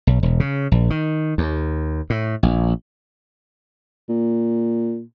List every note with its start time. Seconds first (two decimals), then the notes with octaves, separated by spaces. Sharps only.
0.07 B1
0.23 E1
0.40 C#3
0.72 A#1
0.90 D#3
1.38 D#2
2.10 A2
2.43 A#1
4.09 A#2